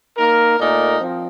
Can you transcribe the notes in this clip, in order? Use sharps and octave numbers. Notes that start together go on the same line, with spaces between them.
A#3 D#4 A#4
A#2 A3 D#4 A#4 D5
F3 C4